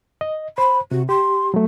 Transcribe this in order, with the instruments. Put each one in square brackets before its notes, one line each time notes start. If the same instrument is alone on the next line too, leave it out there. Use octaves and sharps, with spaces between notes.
[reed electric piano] D#5
[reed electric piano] C5 [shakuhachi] B5
[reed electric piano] C3 [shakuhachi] F#4
[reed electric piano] G4 [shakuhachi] C6
[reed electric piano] F#3 A3